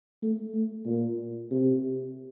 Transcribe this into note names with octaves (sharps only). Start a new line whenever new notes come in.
A3
A3
A#2
C3